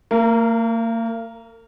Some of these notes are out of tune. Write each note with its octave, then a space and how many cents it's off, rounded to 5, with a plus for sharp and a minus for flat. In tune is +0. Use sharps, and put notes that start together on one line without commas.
A#3 -40 A#4 +0